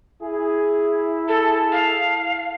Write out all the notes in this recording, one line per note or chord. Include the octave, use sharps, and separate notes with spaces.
E4 G#4
G#4 A4 A5
F5